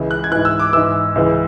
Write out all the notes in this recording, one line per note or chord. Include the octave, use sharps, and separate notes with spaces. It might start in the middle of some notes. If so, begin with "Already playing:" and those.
Already playing: C#2 C#3 E3
F#6
G#6
G#2 E3 F#6
E6
D6
G#2 E3 E6
C#2 C#3 E3